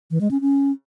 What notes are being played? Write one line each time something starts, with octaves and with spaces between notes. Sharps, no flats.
E3
G#3
C#4
C#4